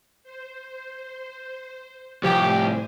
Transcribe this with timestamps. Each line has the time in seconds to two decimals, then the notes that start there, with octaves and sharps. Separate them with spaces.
0.24 C5
2.23 C2 A2 C3 F3 G4 C5 G#5